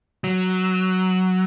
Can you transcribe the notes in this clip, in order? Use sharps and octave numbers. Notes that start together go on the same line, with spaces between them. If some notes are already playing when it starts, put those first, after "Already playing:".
F#3